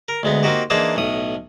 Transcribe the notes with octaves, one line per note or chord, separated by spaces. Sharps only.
A#4
D2 G#3 B3
A#3 C4 D#4 F#4 G4
E3 A#3 D4 D#4 G#4 C5
B1 A2 D#6